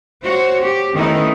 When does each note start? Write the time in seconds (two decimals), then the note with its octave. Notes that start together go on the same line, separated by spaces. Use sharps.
0.24 F#4 C5 C#5
0.62 G4
0.95 D#3 A3 B3 C#4 D#4 E4